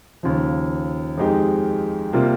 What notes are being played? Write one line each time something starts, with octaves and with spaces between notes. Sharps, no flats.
D#2 C#3 F3
F2 D#3 G#3 D#4 G4
C3 G3 A#3 F4